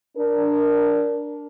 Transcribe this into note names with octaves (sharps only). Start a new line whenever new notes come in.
D4 A#4